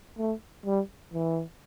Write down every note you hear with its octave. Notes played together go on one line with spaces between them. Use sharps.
A3
G3
E3